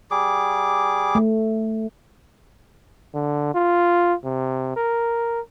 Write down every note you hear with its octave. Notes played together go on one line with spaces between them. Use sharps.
G3 G#4 D6
A3
D3
F4
C3
A#4